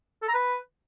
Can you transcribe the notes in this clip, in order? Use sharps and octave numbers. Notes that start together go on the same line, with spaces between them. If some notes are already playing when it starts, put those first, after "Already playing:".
A4
A#5
B4